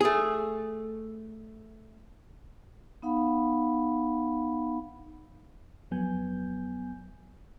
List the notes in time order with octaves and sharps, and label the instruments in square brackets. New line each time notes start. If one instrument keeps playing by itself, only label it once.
[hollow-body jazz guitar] A3 G#4
[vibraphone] B3 D#4 F5 F#5 B5
[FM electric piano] F2 F#3 B3 G#5 G6